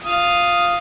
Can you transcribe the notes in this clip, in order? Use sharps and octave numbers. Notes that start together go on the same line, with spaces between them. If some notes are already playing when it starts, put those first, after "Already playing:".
F4 F5 D#6